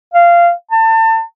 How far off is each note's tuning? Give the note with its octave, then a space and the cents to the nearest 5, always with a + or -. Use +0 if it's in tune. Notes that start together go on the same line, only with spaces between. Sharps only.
F5 -15
A5 +30